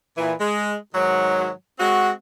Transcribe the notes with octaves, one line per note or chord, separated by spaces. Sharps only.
A#2 E3
G#3
G#2 D#3 F#3
G#3 C4 F#4